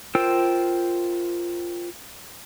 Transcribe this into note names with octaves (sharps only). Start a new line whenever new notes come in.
F4 A#4 C5 G5 E6